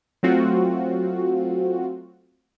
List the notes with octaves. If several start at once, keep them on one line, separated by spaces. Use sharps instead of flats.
F#3 A3 C4 F4 F#4